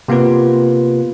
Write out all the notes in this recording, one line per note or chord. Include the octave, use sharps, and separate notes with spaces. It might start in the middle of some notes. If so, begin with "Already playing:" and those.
C3 A#3 B3 F4 B4